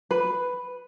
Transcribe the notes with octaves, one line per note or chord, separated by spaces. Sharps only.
B4